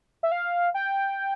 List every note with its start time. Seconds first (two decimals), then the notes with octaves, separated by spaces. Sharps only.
0.23 E5
0.32 F5
0.74 G5